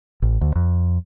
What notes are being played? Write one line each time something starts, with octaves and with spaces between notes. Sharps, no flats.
A1
D2
F2